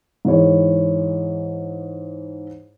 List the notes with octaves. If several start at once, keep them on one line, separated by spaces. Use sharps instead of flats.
G#2 E3 C#5